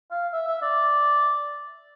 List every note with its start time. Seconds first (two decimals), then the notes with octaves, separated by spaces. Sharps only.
0.11 F5
0.33 E5
0.47 E5
0.62 D5